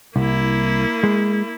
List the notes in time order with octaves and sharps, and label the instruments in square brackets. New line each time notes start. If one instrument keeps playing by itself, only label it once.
[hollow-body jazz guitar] C2 [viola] A#3 E4
[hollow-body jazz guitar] G#3